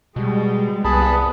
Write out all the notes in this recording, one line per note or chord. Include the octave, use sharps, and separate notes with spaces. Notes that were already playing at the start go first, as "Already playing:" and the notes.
B2 G3 G#3
C2 B3 G#4 A5 B5